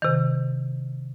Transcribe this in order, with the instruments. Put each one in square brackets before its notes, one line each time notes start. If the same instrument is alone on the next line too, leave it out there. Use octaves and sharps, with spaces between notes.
[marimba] C3 D#3